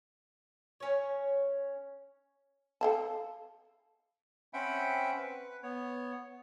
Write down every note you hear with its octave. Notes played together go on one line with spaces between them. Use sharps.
C#4 C#5
A4 F5 A5
C4 C#4 E5 F#5 G5 B5
B4
B3 C#5